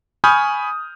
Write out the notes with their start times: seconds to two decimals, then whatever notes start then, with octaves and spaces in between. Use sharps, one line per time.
0.24 G#5 B5 C#6 D#6 F6 G6